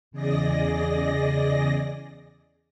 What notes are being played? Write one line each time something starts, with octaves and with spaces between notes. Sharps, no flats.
E2 C#3 G#4 D5 D#5 A#6